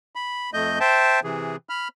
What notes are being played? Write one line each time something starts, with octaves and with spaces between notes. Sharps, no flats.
B5
F2 A3 D#5 G6
C5 E5 G5 A5
C3 E3 G#4
B5 F6